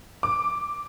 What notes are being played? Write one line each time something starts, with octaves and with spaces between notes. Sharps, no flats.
D6